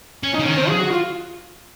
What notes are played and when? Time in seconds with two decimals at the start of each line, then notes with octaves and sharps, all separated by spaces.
0.23 C#4
0.34 D#4
0.39 C#3
0.46 D#3 C#4
0.57 C4
0.69 G#4
0.80 F#4
0.91 F4